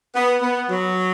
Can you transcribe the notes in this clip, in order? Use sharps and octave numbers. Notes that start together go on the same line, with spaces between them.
B3
B3
F#3